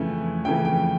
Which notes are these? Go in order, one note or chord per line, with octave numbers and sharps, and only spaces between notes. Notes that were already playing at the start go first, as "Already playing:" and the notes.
Already playing: F2 C#3 E3 A3 G#5
F2 C#3 E3 A3 G5
G5